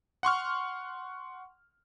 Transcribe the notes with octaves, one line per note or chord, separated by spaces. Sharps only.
F#5 C6 C#6 F6